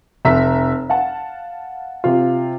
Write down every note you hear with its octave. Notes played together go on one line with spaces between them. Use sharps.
F1 E5 A#5 B6
F5 F#5 A5
C3 F4